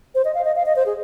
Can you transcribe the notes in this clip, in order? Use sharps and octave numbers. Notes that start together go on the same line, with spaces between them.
C5
D#5
F5
D#5
F5
D#5
C5
G#4